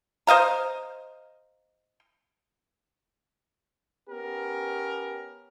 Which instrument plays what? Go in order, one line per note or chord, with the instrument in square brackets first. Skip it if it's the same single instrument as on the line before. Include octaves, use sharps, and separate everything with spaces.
[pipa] C5 D#5 F5 A#5
[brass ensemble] B3 C#4 G4 A#4